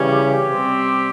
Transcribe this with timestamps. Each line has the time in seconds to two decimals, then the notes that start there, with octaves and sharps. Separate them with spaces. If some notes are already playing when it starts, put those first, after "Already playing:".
Already playing: C#3 E3 G3 C#4
0.12 G4
0.49 C3 G3 C4